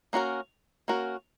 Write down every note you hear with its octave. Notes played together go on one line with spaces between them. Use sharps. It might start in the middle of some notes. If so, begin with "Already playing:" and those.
A#3 C#4 F#4 A#4
A#3 C#4 F#4 A#4